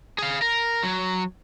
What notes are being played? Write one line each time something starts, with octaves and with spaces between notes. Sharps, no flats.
G#4 F5
A#4
F#3